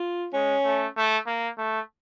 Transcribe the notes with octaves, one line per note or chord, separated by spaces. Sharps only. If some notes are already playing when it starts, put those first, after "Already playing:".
Already playing: F4
G#3 C#4
A3
A3
A#3
A3